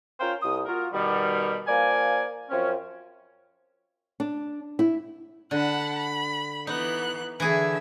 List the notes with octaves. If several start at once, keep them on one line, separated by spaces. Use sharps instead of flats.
C#4 F4 A#4 C5 F5 G5
C2 D#6
A#3 F4 F#4 A#4
B2 D#3 G3
F3 A#3 D5 G#5
F#2 F3 C4 C#4
D4
E4
D3 F#5 A5 B5
B5
E3 B3 D#4 F#6
D3 E3 G#4 E5